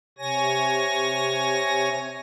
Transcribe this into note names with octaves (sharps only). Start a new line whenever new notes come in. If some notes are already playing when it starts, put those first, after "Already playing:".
C3 C#5 G#5 A#6